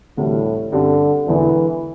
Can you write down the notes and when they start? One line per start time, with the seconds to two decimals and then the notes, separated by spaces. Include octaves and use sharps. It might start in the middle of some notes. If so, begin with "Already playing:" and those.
0.17 D2 A2 C3 E3 G3
0.72 G2 D3 G3 C4
1.28 E1 E2 D3 E3